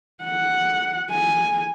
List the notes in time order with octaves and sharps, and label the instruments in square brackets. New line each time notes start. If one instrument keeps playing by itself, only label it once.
[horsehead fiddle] F#5
G#5